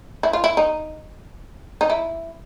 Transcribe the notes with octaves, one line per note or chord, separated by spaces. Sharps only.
E4
F4
E4
D#4
D#4
E4